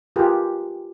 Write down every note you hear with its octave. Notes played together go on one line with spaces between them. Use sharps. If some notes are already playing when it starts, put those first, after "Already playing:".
F4 G4 G#4 A#4 B4